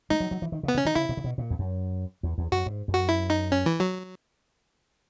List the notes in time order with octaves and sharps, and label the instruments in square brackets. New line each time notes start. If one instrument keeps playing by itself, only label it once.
[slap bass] G#3 [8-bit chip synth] D#4
[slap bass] F#3
F#3
E3
D#3
C#3
[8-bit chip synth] B3
[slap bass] C#3
[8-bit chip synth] C#4
[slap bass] D#3 [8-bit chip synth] D#4
[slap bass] C#3 [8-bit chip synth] E4
[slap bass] A#2
C#3
B2
A#2
E2
F#2
E2
E2
[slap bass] F#2 [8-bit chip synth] F#4
[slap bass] G#2
F#2
[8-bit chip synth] F#4
E4
D#4
C#4
E3
F#3